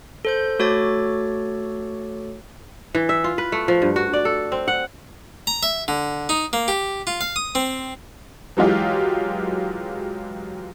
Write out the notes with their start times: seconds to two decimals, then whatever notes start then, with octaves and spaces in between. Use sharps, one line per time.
0.25 A4 C5 G6
0.59 A3 F#4 A4 C#5 D6 A6
2.95 E3
3.09 E5
3.24 F4
3.38 B4
3.52 A3
3.68 F3
3.82 G2
3.96 F#4
4.13 D5
4.25 A4
4.52 C4
4.68 F#5
5.47 A#5
5.63 E5
5.88 D3
6.29 D#4
6.53 A#3
6.68 G4
7.07 F4
7.21 F5
7.36 D#6
7.55 C4
8.57 E3 F#3 G#3 F4 G4